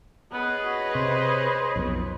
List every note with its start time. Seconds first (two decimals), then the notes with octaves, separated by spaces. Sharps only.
0.33 B3 G#4 B4 C#5 D#5
0.65 F#4
0.95 C3 C5
1.76 B1 F2 B2